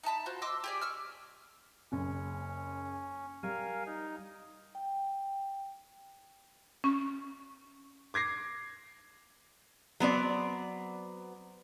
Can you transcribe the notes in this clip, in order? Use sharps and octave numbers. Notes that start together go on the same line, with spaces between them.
D#4 E5 A5 B5
F4 F#4 C5
D#5 C6 D6 E6
G4 G#4 D5
C#6 E6 F6
F#1 C#4
G3 A#4 F5 G#5
D#4
G5
C#4 C#6
D6 G#6 A#6 C7
F#3 B3 C4 D5